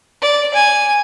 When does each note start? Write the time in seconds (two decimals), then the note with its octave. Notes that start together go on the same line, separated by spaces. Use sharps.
0.22 D5
0.54 G#5